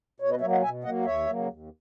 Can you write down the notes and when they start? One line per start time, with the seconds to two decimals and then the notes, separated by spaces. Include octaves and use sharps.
0.20 B2 C#5
0.30 B4 D#5
0.41 F#3 A#3 C#5 E5
0.51 D#5 F#5
0.63 B2 E5 G#5
0.83 F#3 A#3 D#5 F#5
1.05 D#2 C#5 E5
1.26 C#3 F#3 A#3
1.48 D#2